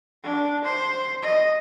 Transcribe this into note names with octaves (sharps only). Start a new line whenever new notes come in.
D4
C5
D#5